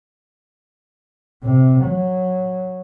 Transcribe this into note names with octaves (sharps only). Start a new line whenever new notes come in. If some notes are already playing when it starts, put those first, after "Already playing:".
C3
F#3